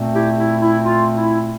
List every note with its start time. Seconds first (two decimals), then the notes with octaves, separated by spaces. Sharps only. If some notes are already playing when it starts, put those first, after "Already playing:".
Already playing: A#2 A3 C4
0.15 E4 G4
0.38 E4
0.61 E4
0.84 F4
1.16 E4